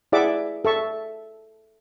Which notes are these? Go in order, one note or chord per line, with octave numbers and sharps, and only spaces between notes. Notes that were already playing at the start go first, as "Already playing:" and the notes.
E4 G#4 D5 E5 F#5 D6
A4 E5 C#6